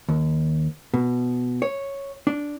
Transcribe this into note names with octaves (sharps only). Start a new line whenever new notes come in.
D#2
B2
C#5
D4